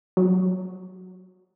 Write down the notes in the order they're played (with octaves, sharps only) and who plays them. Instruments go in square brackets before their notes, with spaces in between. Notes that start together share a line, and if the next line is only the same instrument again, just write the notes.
[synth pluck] F#3